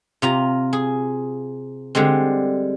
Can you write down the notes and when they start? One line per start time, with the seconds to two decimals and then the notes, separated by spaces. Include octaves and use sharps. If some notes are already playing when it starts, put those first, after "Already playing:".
0.22 C3 F4 A#5
0.73 G#4
1.95 D3 G3 G#3 C4